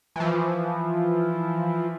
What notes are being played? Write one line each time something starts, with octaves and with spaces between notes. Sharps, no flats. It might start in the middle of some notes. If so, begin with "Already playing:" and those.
E3 F3